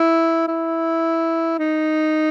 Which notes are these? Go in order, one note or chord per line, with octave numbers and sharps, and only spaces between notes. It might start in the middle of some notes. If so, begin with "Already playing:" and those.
Already playing: E4
E4
D#4